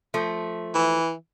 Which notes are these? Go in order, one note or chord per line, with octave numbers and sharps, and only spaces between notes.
F3 A3
E3